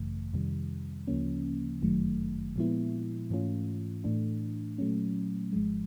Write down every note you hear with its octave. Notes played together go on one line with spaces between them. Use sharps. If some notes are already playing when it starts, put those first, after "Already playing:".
Already playing: G#1 F#2 C#3 E3 A3
F2 C3 D#3 G3
D2 C#3 F3 A#3 C#4
G1 F#2 D#3 F#3 A3
A#2 F3 G#3 B3 E4
G#2 E3 A3 C#4 F4
A2 E3 A3 D4
A#2 F#3 A3 C#4
G#1 G#2 F3 G#3